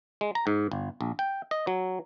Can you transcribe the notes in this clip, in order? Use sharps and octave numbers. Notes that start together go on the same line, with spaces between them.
G#3
A#5
G#2
G1
A#1
G5
D#5
F#3